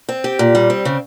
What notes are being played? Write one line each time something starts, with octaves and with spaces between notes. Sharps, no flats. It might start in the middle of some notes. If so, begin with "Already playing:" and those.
C4
G4
A#2
G3
C4
C#3